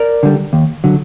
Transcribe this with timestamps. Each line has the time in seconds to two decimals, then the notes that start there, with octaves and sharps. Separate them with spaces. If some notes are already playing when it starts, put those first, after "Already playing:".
Already playing: A#4 D5
0.23 D3 G3
0.53 D#2
0.84 D3 F#3